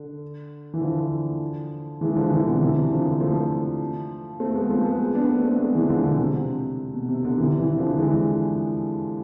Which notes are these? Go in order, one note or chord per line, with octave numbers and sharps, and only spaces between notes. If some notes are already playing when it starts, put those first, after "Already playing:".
Already playing: D3
E3
D3 F3
E3 G#3
D3 F3
C3 E3
B2 D3
C3 E3
D3 F3
F3 A3
A3 C4
G#3 B3
F3 A3
G#3 B3
B3 D4
A3 C4
A3 C4
G#3 B3
E3 G#3
D3 F3
B2 D3
C3
B2
C3
B2 D3
C3 E3
C3 E3
D3 F3
E3 G#3